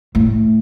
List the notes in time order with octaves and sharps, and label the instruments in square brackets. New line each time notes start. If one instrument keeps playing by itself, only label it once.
[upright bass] A2